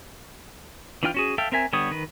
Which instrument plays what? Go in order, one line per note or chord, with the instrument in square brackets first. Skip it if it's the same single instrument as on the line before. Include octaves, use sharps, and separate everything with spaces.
[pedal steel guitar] E3 D4 F4 G5 F6
C#4 F#4 G#4
A4 E5 F5 G5
C4 A#4 E5 G#5
D3 G3 B3 C#5 D#6
D#3 B4